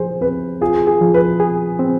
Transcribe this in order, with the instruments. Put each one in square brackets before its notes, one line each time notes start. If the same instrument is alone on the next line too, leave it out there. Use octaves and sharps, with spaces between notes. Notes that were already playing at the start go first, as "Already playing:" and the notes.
Already playing: [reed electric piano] F3 G#4 [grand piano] C5
[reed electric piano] C4 [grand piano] B4
[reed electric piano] F4 [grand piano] G#4
[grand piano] G#4
[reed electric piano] F3
[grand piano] B4
[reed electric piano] G#4
C4